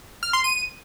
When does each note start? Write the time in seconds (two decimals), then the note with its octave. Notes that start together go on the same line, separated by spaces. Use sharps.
0.23 F6
0.33 C6
0.44 D#7